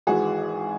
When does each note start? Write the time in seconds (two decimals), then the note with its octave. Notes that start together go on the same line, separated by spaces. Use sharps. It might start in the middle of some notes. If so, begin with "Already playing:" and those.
0.07 G#1 G#2 E3 G#3 F#4 G#4